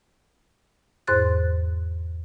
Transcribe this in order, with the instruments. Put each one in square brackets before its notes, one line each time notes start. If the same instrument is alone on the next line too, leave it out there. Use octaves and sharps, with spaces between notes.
[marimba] E2 G#2 C5 C6 F#6 A6